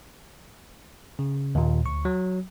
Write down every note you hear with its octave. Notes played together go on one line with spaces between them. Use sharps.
C#3
D#2 A#2
D2 C#6
F#3